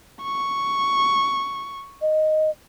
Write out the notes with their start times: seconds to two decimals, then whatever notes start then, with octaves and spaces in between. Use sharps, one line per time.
0.23 C#6
2.02 D#5